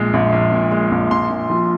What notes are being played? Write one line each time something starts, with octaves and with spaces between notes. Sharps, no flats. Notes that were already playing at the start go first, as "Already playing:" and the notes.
Already playing: A#1 A#2 G#3
A#1
A#1
A#2
G#3
A#1
A#1 C6
A#2
F3